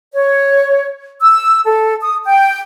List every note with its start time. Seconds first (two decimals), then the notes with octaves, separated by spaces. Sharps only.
0.13 C#5
1.21 E6
1.65 A4
2.01 D#6
2.25 G5